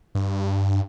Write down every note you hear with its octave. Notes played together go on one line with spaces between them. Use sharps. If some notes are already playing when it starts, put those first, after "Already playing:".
G2